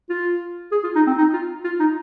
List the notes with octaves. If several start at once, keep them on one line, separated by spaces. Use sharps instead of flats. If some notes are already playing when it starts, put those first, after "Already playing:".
F4
G#4
F4
D#4
C4
D#4
F4
F4
D#4